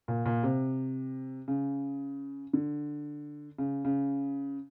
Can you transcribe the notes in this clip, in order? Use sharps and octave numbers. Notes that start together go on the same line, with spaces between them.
A#2
A#2
C3
C#3
D3
C#3
C#3